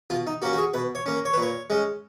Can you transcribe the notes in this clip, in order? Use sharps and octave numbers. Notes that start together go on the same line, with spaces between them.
B2 F4
D#4
A#3 C#4 F#4
F#4
G#4
B2 B4
C#5
A#3 C#4
C#5
B4
A#2 C#5
G#3 C#4